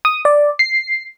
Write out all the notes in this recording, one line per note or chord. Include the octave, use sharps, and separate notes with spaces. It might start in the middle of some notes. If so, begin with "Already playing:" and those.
D#6
D5
C7